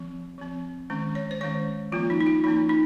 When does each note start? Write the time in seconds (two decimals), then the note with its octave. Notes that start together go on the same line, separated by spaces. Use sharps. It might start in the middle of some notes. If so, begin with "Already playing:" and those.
Already playing: F3 C4
0.38 F3 C4
0.90 D#3 G#3 C#4
1.15 C#5
1.31 C5
1.41 D#3 G#3 C#4 C#5
1.92 F3 A#3 C#4 F4
2.10 D#4
2.21 D#4
2.27 F4
2.44 F3 A#3 C#4 D#4
2.69 D#4